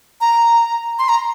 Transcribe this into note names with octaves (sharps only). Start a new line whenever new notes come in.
A#5
C6
A#5